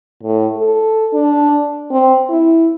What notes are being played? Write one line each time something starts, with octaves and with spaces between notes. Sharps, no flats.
A2
A4
D4
C4
E4